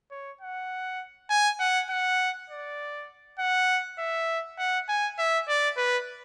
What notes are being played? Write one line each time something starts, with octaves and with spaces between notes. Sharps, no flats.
C#5
F#5
G#5
F#5
F#5
D5
F#5
E5
F#5
G#5
E5
D5
B4